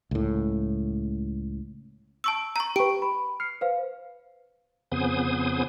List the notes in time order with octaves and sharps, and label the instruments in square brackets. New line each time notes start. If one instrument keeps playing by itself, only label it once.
[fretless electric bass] C#2 A2
[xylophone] A5 C#6 E6
A#5 C#6
[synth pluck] G4 B4 [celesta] G5 C#6 [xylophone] D7
[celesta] B5
[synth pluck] F6 [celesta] C7 C#7
[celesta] B4 C5 F5
[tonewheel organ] F2 C#3 B3 C5 G#5 D#6